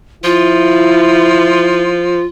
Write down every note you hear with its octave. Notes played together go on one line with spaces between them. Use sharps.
F3 E4 F4